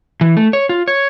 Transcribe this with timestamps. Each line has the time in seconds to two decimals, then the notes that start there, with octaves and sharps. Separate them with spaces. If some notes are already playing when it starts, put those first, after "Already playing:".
0.21 E3
0.37 A3
0.53 C#5
0.69 F4
0.88 C#5